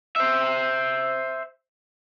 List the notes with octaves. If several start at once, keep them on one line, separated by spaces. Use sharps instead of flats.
C5 E5